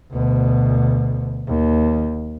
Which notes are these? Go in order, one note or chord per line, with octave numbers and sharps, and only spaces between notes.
D2 B2
D#2